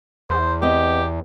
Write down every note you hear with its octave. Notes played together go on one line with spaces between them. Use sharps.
E2 C5
B3 C4 G4 D#5